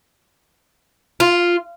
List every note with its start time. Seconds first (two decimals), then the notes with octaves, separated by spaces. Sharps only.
1.20 F4